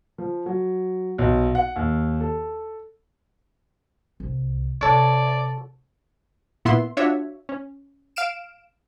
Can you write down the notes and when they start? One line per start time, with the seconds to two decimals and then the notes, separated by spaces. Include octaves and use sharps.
0.18 F3
0.46 F#3
1.18 B1
1.55 F#5
1.76 D#2
2.21 A4
4.20 C2
4.81 C3 A4 C#5 D5
6.65 A#2 B3 E4 E5 C6
6.97 D4 F4 F#4 C#5 E5
7.49 C#4
8.16 F5 F6 D7 E7